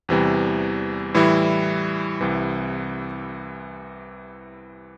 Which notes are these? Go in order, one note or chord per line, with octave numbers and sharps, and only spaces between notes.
E2 C3 E3 G3
A2 E3 G3 E4
C2 C3 E3